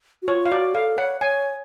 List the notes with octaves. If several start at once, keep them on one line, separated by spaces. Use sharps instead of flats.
F#4
F4 C#5
F5
F#4 D5
A4 F5
C#5 F#5
C#5 G#5